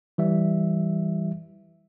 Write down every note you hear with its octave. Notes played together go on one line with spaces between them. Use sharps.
E3 G3 E5